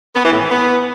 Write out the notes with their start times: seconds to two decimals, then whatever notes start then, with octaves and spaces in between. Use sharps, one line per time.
0.15 B3
0.24 E3
0.33 A2
0.41 E3
0.50 B3